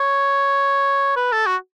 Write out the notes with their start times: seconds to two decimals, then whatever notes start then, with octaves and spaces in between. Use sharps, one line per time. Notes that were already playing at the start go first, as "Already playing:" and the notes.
Already playing: C#5
1.16 B4
1.32 A4
1.47 F#4